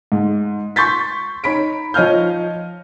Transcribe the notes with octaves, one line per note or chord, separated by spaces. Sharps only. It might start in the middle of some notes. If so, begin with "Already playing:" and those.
G#2
C6 C#6 G6 A6 B6
D#4 C#5 B5 B6 D7
F3 C#5 D#5 F5 F6 G6